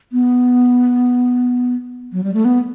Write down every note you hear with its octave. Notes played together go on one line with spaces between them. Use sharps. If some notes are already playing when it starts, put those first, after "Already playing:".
B3
F#3
G3
A3
B3